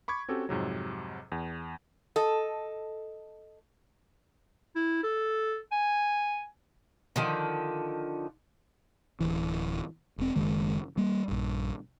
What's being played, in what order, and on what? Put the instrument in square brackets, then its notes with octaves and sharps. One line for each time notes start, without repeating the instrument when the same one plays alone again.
[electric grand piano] B5 C#6 D6 G#6
C4 C#4 F#4 G4 A4
F2 G#2 C3 F#3
E2
[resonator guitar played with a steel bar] A4 D#5
[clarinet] E4
A4
G#5
[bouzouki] D3 D#3 F3
[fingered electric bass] D1 E3
E1 C4
F#1 D#3 G#3
G3 A#3
A#1 G2